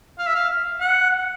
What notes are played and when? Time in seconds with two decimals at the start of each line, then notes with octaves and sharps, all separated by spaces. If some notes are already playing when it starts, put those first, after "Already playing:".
0.19 F5
0.27 E5
0.35 F5
0.81 F#5